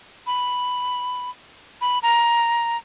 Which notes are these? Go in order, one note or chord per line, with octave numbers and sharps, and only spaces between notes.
B5
B5
A#5